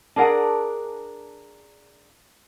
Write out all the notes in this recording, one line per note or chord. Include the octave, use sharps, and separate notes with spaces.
D4 G#4 A#4 F#5